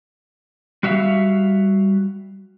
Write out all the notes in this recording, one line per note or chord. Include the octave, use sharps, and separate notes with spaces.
G3 F#4 E5 F5